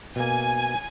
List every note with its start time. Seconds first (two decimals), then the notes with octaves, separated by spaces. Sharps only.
0.16 B2 A#3 G#5